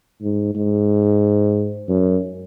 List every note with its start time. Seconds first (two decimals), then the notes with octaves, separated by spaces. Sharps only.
0.22 G#2
0.55 G#2
1.88 F#2